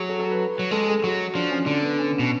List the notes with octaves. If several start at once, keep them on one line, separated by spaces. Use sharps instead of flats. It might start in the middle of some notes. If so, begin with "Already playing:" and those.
Already playing: F#3 F#4 G#4
A4
A4
B4
F#3
G#3 A4
G#4
F#3 F#4
F3 D4
C#4
D3 D4
B3
C#4
B2